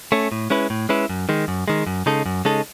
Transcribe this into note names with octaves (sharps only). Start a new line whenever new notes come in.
A3 C#4
A2
G#3 C#4 E4 B4
A2
G#3 C#4 E4 B4
F#2
D#3 G#3
F#2
D#3 G#3
F#2
C#3 G#3 D#4 A4
F#2
C#3 G#3 D#4 A4